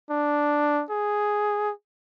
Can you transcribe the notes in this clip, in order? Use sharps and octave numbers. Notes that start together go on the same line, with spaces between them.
D4
G#4